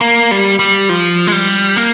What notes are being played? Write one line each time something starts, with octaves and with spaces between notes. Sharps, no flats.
A#3
G3
G3
F3
G#3
G3
A#3